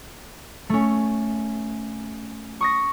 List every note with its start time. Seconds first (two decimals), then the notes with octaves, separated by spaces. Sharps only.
0.70 A3 C#4
2.61 C#6 D#6 A#6